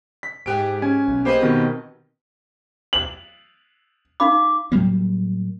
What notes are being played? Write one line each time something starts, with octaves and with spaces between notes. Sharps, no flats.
B6
G#2 G4 G#4 G5 F#6 D7
C#4 G#5 G#6
B1
A#3 G4 G#4 B4 C5 D#5
B2 D#3 C4
F#7
D#4 F5 B5 D6
A2 F#3 G3 A#3